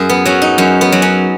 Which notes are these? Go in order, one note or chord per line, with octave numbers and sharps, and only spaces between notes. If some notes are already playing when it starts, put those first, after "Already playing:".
Already playing: F#2 G#4
B3
F#3 C#4
D#4
F#2 C#4
B3
F#3
C#4